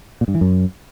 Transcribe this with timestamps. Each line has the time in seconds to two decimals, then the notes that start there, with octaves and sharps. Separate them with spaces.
0.21 A#2
0.28 G2
0.34 E3
0.41 F#2